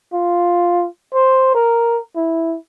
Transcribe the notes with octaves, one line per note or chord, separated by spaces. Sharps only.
F4
C5
A#4
E4